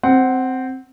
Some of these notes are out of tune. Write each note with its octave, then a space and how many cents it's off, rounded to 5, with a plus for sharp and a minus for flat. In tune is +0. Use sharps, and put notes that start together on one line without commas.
C4 +0 F#5 +15